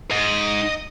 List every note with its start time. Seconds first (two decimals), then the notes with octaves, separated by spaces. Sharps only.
0.11 G#2 D#5